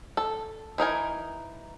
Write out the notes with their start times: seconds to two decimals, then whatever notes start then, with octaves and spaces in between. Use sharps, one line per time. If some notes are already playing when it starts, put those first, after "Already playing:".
0.17 A4
0.78 E3 D#4 A#4 G#5